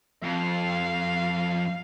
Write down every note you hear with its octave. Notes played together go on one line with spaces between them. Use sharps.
F2 F5